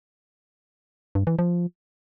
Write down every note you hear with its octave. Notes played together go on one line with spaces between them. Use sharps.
G2
E3
F3